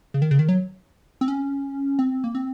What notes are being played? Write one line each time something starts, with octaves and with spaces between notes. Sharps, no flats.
C#3
D#3
C#3
D#3
F#3
C4
C#4
C4
A#3
C4